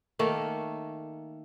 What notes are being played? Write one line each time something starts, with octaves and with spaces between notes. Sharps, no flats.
D#3 A3 A#3